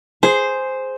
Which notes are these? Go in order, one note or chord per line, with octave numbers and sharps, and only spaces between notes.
G#4 C5